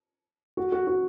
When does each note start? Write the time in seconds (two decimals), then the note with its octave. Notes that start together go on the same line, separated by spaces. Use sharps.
0.57 F#4
0.72 F#4
0.87 F#4